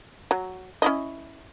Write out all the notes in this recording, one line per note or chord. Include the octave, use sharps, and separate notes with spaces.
F#3
C#4 E4 D#5